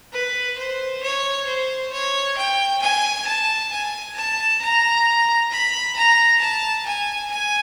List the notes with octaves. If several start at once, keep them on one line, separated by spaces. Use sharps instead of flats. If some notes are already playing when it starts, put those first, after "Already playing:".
B4
C5
C#5
C5
C#5
G5
G#5
A5
G#5
A5
A#5
B5
A#5
A5
G#5
G#5